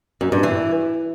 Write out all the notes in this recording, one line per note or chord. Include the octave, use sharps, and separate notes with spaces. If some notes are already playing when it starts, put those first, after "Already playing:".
F#2
G2
E3